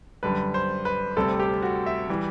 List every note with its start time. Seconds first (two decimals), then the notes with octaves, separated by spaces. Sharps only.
0.23 F#2 D3 G3 B4
0.54 C5
0.85 B4
1.16 D2 C3 G3 A4
1.40 G4
1.63 F#4
1.86 E5
2.09 E3 G3